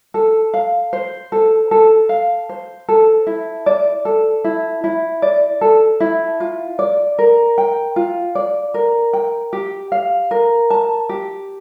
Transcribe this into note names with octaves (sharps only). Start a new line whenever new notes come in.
A4
F5
C5
A4
A4
F5
C5
A4
E4
D5
A4
E4
E4
D5
A4
E4
F4
D5
A#4
G5
F4
D5
A#4
G5
G4
F5
A#4
A5
G4